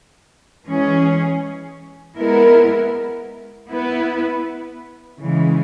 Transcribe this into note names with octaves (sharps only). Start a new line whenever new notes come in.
E3 G#3 C#4 G#4
G#3 B3 E4 A#4
B3 E4 B4
C#3 E3 G#3